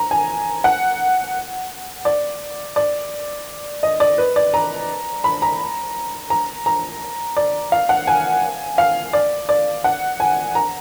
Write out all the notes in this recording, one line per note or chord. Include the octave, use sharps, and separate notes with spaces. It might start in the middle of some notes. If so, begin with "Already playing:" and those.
Already playing: A#5
G#5
F#5
D5
D5
D#5
D5
B4
D5
A#5
B5
A#5
A#5
A#5
D5
F5
F#5
G#5
F5
D5
D5
F#5
G#5
A#5